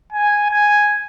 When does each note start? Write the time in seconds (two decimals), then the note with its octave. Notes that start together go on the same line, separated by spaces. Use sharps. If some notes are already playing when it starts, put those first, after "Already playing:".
0.12 G#5
0.51 G#5